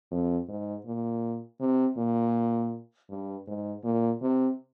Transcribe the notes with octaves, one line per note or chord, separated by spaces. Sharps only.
F2
G#2
A#2
C3
A#2
G2
G#2
A#2
C3